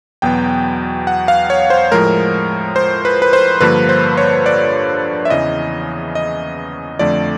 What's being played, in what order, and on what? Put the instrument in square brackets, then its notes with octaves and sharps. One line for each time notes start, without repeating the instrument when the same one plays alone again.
[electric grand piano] E2 B2 F#3 B3 G5
F#5
F5
C#5
C5
A2 F3 G#3 A#4
C5
B4
B4
C5
G2 D3 F3 A#3 B4
C5
C#5
D5
E5
E2 C#3 E3 D#5
D#5
F2 D3 F3 A3 D5